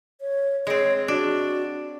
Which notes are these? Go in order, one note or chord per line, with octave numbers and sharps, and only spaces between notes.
C#5
G#3 C4 C#5
D4 F#4